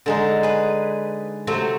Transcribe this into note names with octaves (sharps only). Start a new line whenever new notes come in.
D3 G#3 D#4
G#4 B4
C3 F#3 A3 C4